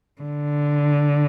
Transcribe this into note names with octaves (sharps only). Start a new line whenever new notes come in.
D3